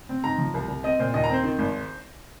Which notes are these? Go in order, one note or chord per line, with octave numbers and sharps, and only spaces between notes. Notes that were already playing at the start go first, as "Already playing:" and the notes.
C4
G#2 A#5
F3
C2
C2
C4 D#5
A#2 C5
D#2 D#5
A#5
C4 C5
D#3
G#1